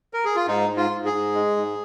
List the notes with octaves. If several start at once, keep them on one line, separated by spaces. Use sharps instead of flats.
A#4
G#4
F4
G#2 D#4
G#2
F4
G#2
G#4
G#2
G#3
G#2